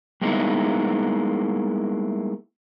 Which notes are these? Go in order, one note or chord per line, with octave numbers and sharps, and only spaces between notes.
G3 G#3 A#3 B3 D#4 E4